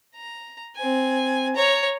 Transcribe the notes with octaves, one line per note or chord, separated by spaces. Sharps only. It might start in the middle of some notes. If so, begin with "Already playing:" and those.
A#5
C4 G#5
C#5 A#5